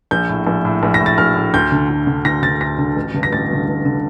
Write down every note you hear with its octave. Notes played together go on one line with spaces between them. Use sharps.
A#1 G6
A2
A#1
A2
A#1
A#6
A2
A6
A#1 F6
A2
D2 G6
D3
D2
D3
D2 A#6
D3 A6
D2 A#6
D3
A1
G2 D3
A#6
A1 A6
G2 D3
A1
D3